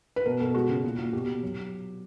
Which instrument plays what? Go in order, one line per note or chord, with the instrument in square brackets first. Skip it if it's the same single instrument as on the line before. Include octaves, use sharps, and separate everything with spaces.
[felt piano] B4
B2 A#4
B2 A4
G#3 F#4
C#3
A#2
A#2
B2 G4
B2
F#3